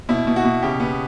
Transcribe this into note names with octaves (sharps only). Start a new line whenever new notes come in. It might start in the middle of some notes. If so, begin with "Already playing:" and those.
B2 E4
B2
F#4
B2
C#3 G4
B3